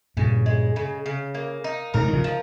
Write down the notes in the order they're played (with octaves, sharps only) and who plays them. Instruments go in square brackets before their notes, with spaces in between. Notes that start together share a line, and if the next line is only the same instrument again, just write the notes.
[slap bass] G2 A#2 [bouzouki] C#3
[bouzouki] G#3
C#3
C#3
A#3
D#4
[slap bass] G#2 C3 [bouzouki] A#4
[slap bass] D#3
C#3 F3
[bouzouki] F3